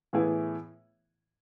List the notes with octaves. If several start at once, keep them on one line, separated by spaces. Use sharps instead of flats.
A2 E3 B3 E4 G#4